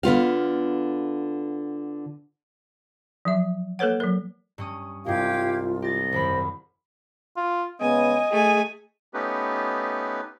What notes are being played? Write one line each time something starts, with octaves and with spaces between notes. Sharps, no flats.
D3 B3 F4 F5
F3 F#3 E5
A#3 A4 B4 C#5 F#5
F#3 A#4
G2 C#4 D#6
C2 G2 G#3 F4 G4 F5 G#6
G4 D#5 A6
G#1 F#2 C5 B5
F4
C#3 G#3 B3 D#5 G#5
A3 G#4 G#5
A3 B3 C#4 D#4 G4 B4